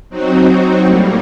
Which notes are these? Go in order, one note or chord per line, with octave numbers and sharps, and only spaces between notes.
F#3 C4 D#4 F#4
A2 G3 A#3